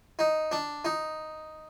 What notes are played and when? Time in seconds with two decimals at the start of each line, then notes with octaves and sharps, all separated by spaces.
0.19 D#4
0.52 D4
0.85 D#4